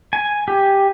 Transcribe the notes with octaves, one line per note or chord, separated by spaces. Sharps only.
G#5
G4